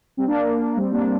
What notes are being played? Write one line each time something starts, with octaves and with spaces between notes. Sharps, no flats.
G3 C4
A#3 D4
G3 C4
A#3 D4